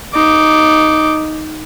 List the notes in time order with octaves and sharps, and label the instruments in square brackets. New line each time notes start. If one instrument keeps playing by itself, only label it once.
[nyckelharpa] D#4 D6